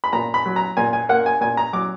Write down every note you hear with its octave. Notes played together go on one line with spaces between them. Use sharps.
B5
A#2 A#5
B5
F#3
A#5
A#2 G#5
G#5
A#3 F#5
G#5
A#2 G#5
A#5
F#3 D6